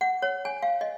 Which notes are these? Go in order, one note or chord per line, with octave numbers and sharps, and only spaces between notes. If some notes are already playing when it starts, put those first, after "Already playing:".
F#5
C#5
G#5
F5
D#5